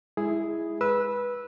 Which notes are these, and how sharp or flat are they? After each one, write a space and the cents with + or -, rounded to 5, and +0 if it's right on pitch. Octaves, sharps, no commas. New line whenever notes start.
G#3 -10 E4 +0 G#4 +0
B4 -15 E6 -5